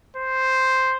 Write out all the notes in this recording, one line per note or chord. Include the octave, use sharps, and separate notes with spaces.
C5